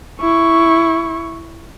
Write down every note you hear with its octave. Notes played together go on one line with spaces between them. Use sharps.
E4 C#6